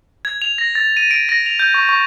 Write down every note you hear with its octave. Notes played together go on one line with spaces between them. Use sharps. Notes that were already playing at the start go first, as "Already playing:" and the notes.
G#6
F7
A#6
A6
D#7
D7
A#6
F7
G6
C#6
C#6